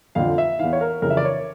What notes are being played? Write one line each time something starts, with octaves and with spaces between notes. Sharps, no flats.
F2 D3 F3 F5
E5
E2 E3 F5
C#5
A#4
F2 C#3 E3 A#4
E5
D5
C#5